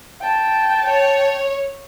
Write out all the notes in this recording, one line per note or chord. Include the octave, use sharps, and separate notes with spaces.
G5 A5
C#5